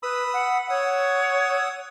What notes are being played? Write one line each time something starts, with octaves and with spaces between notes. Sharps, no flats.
B4 B5 D#6 E6
F#5
C#5 F#5 D#6 E6